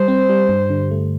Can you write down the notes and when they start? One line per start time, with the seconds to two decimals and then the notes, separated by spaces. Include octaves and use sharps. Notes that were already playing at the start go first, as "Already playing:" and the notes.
Already playing: G3 C5
0.08 C4
0.29 G3
0.49 G2
0.70 D3
0.91 A3